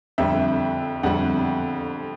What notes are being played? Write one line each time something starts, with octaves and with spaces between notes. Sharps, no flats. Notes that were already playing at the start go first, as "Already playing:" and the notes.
F2 D3 G3 E5
F2 D3 G3 F#5